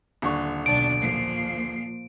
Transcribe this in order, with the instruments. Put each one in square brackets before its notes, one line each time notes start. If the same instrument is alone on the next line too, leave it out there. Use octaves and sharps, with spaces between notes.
[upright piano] D#1 D3 C#6
[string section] B1 D4 [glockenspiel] D7
[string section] A#2 F3 C7